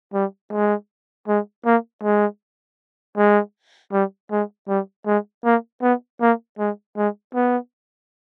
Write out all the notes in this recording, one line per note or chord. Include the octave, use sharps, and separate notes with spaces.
G3
G#3
G#3
A#3
G#3
G#3
G3
G#3
G3
G#3
A#3
B3
A#3
G#3
G#3
B3